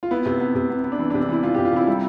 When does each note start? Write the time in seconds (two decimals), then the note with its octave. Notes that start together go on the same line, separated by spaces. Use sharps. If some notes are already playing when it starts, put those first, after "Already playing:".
0.03 F4
0.11 B3 E4
0.26 C3
0.40 B3
0.55 C3
0.70 B3
0.84 B3
0.92 D4
0.99 E3 E4
1.10 D4
1.14 C3
1.21 D4
1.29 E3 E4
1.43 E3 F4
1.54 G4
1.58 C3
1.65 F4
1.72 C3 E4
1.87 G3 E4